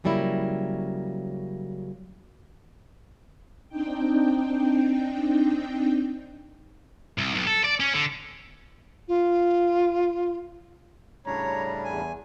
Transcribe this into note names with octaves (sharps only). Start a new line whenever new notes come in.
C#3 F#3 G3 A#3 E4
C4 D4 D#4 G5
C2
B1
A4
D5
C#4
D3
F4
A2 C#3 G3 C#4 D4 C#5 A#5
E2 G#5